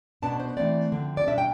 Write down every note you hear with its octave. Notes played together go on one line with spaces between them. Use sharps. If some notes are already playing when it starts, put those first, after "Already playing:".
B2 B3 D4 A5
C5
E3 A3 C4 D5
D3 F3 C4
D5
B2 G3 D4 E5
G5